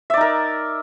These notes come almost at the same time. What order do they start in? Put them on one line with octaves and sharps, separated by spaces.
E5 D5 D#4 A#4